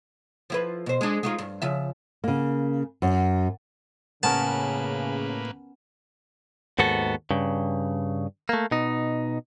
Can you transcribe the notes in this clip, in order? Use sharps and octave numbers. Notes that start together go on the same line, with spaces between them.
F3 E4 B4
B2 C5
G#3 D4
G#3 D#4 F4
G2
C#3 F3 E5
C#3 A#3
F#2
A2 C#3 A#3 B3 C#4 A#4 B4 A5
D#2 G#2 B3 F#4 A4
G2 C#3
A3 A#3
B2 D#4